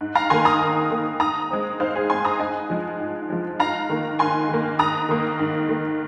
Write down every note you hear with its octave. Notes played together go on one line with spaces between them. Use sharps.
G#2
F5 A#5
D#3 A#3 G#5 C6
A#5 D#6
G#2
D#3 A#3
G#2 A#5 D#6
G#3 C4
G#2 C5 F5
G#4 C5
G#3 C4 G#5 C6
A#5 D#6
G#2 D#5 G#5
F3 G#3
G#2
F3 G#3
G#2 F5 A#5
D#3 A#3
G#2 G#5 C6
D#3 A#3
G#2 A#5 D#6
D#3 A#3
G#2
D#3 A#3